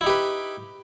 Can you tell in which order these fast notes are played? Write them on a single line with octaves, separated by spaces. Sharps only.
E4 D#4 G4 B4